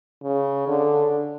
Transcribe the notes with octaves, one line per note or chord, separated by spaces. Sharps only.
C#3
D3